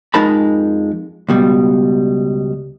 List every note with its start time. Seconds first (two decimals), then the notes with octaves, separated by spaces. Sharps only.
0.14 F2 G#3 D#4 A#4 A5 B5
1.29 C#2 B2 G3